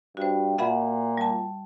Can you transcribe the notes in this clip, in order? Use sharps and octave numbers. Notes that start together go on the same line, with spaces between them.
G2 F#4 C5
A#2 E5 F#5 B5
G3 A5